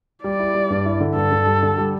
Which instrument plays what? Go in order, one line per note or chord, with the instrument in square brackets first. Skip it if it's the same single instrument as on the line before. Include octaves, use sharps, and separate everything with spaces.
[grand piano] G3 [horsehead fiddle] D5
[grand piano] E4
G3
G2
E4
D3
[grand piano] G2 [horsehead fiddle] A4
[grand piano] G2
G3
D3
G3